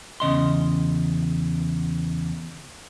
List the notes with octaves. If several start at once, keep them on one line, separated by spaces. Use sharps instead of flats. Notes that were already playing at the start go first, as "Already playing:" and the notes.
E2 C#3 D#5 C6